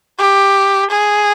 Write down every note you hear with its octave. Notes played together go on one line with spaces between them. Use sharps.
G4
G#4